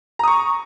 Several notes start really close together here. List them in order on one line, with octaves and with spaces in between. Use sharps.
A#5 D#6 C#6